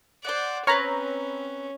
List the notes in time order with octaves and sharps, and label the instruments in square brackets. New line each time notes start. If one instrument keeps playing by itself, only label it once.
[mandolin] C5 F#5 [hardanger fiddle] D5
[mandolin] C4 B4 F6 [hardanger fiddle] C#4 [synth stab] C#5 A#5